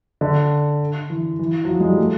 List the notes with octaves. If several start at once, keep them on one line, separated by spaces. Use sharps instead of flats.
D3
E3
E3
F#3
F3
G#3
G3
A3